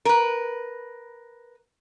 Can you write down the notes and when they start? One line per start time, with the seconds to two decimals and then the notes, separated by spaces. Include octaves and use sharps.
0.05 A#4 B4